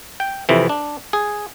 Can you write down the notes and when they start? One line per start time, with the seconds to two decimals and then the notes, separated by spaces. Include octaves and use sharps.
0.20 G5
0.49 F2 C3 E3
0.69 D4
1.13 G#4